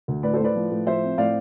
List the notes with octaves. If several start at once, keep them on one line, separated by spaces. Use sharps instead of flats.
D2
A2 B4 D5
A4 C5
A2 B4 D5
F3
A2
F3 C5 E5
C4
A2 D5 F5